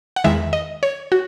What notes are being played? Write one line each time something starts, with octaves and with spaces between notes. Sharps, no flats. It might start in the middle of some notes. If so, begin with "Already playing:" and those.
F#5
E2 D#3 G#3 E5
D#5
C#5
F#4